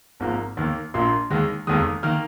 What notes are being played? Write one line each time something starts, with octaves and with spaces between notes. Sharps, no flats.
G#1 G#2 F3 A#3
D#2 D#3 A#3
A#1 A#2 A#3 C6
D#2 D#3 G#3
F1 D#2 D#3 G#3 D#6
D#3 A#3 F6